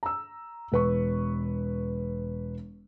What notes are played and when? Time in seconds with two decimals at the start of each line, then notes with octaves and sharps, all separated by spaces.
0.03 A#5 E6
0.72 E1 B4 C#6